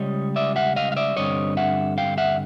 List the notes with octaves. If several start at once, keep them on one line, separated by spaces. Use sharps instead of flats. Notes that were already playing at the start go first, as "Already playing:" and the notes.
Already playing: C#2 G3 C#5 D#5
D5 E5
E5 F#5
D#5 F5
F5
D5 E5
G2 D3 G3 C4 C#5 D#5
E5 F#5
F5 G5
E5 F#5